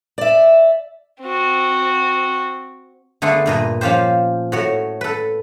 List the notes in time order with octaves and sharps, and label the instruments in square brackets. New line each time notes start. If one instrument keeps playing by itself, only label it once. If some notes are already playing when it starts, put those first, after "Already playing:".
[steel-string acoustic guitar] D5 E5
[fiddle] C4 F#4
[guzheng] D3 A3 B3 G#4 C6
G2 A#2 D#5
F3 C#4 F4 G4 C5
A2 F#4 C#5
A4 B4